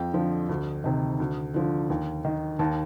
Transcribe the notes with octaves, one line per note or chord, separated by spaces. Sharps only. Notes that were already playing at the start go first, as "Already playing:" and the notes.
Already playing: F2 G5
D3 F3
D2
C3 D#3
D2
D3 F3
D#2
D#3
D#2 A5